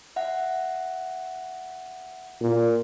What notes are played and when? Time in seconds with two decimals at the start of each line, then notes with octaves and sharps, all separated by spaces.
0.16 E5 F#5
2.41 A#2